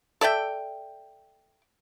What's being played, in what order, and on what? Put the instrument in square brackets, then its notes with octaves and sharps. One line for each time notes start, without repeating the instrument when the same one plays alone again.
[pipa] A4 D5 E5 G5